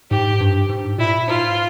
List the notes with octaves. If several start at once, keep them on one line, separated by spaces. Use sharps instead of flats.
G#2 G4
G2
G#2
A#2 E4
G#2 F4